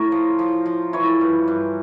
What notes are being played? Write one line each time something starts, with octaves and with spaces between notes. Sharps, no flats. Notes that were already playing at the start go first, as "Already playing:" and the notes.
Already playing: A2 A#4 C#5
F3
F3
F3
E3 C#5
G2
G2